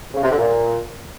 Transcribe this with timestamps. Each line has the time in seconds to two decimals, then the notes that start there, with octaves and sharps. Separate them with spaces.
0.14 C#3
0.22 C3
0.30 D3
0.37 A#2